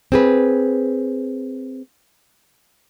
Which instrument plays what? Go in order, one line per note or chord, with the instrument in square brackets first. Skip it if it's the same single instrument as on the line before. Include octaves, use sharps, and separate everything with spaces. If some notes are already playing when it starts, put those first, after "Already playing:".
[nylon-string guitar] C4 G#4 B4